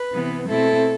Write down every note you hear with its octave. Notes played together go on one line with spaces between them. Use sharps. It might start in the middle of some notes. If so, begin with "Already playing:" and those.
Already playing: B4
C3 E3 B3
B2 A3 C4 E4 A4